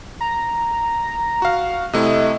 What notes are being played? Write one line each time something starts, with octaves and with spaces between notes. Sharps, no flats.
A#5
F#4 F5
C3 A3 E4 D#5